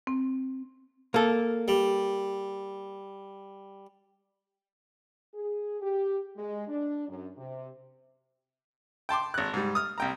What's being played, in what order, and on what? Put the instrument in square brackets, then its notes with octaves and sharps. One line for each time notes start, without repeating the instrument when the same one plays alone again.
[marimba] C4
[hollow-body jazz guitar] A#3 A4
[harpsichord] G3
[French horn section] G#4
G4
G#3
D4
F#2
C3
[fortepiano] G5 A5 C6 D6
G#1 F#6
G#2 G3
D#6 F6
C2 G5 A#5